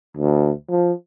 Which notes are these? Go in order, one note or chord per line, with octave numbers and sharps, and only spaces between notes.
D2
F3